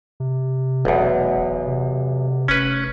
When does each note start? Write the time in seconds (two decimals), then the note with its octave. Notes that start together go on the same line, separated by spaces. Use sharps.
0.20 C3
0.85 F1 B1 E2
1.67 C3
2.48 F1 C#4 B4